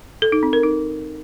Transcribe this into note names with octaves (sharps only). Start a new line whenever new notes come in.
A4
D#4
C4
A#4
D#4